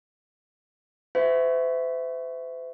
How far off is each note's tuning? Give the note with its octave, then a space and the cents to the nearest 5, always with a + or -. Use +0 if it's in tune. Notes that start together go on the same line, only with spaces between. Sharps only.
F#4 +0 C5 -45 E5 +0